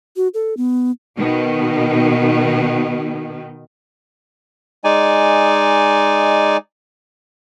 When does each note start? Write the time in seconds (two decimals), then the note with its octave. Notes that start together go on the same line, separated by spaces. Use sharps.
0.16 F#4
0.34 A4
0.57 B3
1.16 B2 D#3
4.84 G#3 D#4 D5 G#5